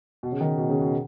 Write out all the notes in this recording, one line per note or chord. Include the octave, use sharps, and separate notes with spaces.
B2
C#3
D#3
B2
C#3
B2